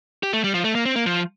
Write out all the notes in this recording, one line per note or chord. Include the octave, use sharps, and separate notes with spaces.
G4
A3
G3
F3
A3
A#3
C4
A#3
F3